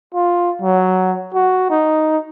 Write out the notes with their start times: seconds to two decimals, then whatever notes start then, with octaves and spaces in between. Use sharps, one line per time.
0.14 F4
0.62 F#3
1.34 F#4
1.70 D#4